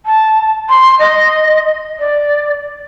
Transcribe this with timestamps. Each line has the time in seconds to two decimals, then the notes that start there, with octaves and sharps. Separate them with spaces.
0.06 A5
0.69 C6
0.99 D#5
1.99 D5